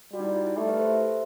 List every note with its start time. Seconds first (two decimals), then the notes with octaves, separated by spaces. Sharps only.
0.13 G3 F#4
0.20 D#4
0.25 E4
0.36 E4
0.47 E4
0.57 A3 G4
0.69 G4 B4
0.79 A4 C5
0.90 C5 E5